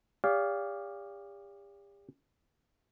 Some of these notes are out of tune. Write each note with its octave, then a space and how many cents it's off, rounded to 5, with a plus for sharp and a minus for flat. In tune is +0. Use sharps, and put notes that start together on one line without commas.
G4 +40 D5 -35 F5 +0